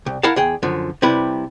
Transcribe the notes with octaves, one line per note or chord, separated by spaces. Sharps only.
C2
E4 A#4 F5 F#5 A5
E2 G#4 G5
F#2 D3 F3
C3 G3 E4 B4